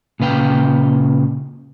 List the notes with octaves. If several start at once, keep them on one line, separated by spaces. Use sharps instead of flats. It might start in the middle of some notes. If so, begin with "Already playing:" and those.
A#2 C#3 B4 F5 G5